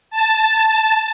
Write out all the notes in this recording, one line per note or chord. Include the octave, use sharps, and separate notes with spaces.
A5